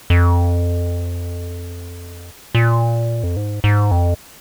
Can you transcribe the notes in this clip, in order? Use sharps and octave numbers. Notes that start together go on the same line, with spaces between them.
F2
A#2
F2
G#2
G#2
F2